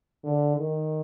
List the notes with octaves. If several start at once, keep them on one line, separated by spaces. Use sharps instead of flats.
D3
D#3